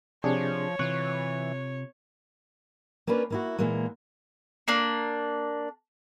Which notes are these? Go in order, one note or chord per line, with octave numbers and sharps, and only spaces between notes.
C3 F3 D4 G#4 C#5
C3 E3 F4 C#6 F#6
A#3 C#4 D4 F4 B4
A#3 E4 F#4
A#2 E3 G#3 A#3
A#3 D4